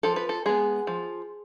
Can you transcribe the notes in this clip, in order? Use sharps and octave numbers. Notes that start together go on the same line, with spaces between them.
F3 A4
B4
A4
G#3 B3 G#4
F3